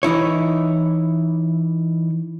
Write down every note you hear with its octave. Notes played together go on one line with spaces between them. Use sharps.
E3 D#4 E4 C#5